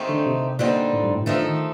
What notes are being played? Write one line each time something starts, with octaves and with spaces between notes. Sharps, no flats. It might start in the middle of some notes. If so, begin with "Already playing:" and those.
Already playing: D#3 A3 C4 D#4 G4
D3
C3
A#2 D3 G3 C4 D#4
A2
G2
A2
D3 F3 A3 D#4 A4
D#3